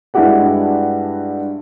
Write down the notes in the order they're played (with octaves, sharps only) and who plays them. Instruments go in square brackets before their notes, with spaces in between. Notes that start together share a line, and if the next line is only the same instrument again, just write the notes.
[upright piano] G2 G#3 E4 F#4 G4 F#5